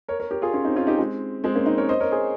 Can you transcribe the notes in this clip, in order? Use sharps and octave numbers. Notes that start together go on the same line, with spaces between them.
A#4 C#5
A#4 C#5
G4 A#4
F4 G#4
C#4 F4
C4 D#4
C#4 F4
D#4 G4
G#3 C4
G#3 C4
A#3 C#4
C4 D#4
A#4 C#5
C5 D#5
A#4 C#5
G#4 C5